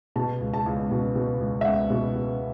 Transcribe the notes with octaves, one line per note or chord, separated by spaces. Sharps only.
B2 A5
C#2
A5
C#2
B2
B2
C#2
E5
C#2 F#5
B2
B2